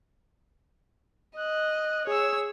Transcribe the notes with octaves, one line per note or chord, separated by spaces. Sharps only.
D#5 F#6
G#4 C#5 E6